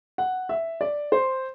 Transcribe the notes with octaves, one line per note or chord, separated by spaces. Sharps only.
F#5
E5
D5
C5